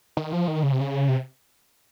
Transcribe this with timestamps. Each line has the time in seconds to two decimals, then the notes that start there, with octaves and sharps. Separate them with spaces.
0.17 D#3
0.33 F3
0.48 D#3
0.63 C#3
0.72 C3
0.80 C#3
1.09 C3